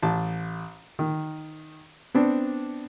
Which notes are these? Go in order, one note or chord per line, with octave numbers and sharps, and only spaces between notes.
A1 A5
D#3
B3 C4 D4